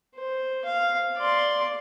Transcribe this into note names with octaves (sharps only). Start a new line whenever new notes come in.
C5
F5
D5 C6